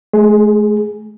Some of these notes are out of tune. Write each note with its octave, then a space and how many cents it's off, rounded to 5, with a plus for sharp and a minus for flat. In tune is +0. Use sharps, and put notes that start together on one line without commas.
A3 -45 G#4 +0